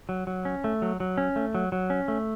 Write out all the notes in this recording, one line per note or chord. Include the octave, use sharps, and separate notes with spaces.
F#3
F#3
C#4
A3
F#3
F#3
C#4
A3
F#3
F#3
C#4
A3